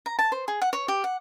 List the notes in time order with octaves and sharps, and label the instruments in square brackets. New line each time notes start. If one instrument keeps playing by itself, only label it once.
[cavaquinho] A#5
A5
C5
G#4
F#5
C#5
G4
F#5